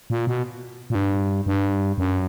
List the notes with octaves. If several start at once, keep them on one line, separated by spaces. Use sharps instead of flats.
A#2
B2
A#2
G2
G2
F#2